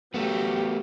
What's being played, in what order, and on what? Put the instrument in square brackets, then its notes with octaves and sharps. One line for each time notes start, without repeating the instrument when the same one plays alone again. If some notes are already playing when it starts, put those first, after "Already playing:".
[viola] F#3 G4 [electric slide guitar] A3 B3